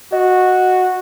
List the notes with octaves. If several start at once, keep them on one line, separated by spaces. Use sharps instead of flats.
F#4 D#5